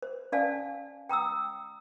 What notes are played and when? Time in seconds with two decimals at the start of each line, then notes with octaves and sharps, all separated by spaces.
0.02 C5
0.32 C#4 D5 F5 G#5 A5
1.09 G5 A#5 D#6 E6